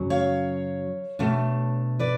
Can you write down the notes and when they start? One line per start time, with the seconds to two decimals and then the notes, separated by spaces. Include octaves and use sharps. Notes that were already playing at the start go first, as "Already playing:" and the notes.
Already playing: F#2 C#3 F#3
0.10 C#5 F5
1.19 B2 A3 D4
1.99 B4 D5